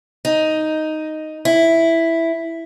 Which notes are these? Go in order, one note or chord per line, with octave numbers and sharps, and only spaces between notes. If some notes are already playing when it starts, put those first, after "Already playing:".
D#4
E4